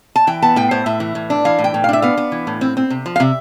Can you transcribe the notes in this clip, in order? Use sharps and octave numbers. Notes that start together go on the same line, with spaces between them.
A5
E3 G5
B3 A5
A2 G5
A2 C5
A2 E5
E3
A2
D4
E3 F5
A2
G5
A2
F5
D4 E5
B3 F5
B3
E3
A2
C4
C4
C3
F3
F5
C3 E5